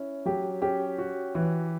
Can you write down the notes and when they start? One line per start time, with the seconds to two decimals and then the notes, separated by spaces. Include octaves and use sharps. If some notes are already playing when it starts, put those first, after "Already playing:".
Already playing: C#4 E4
0.26 F#3 G4
0.62 C#4 G4
0.98 F#4
1.35 E3